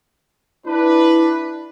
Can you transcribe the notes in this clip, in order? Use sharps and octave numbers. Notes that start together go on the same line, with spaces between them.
D4 E4 B4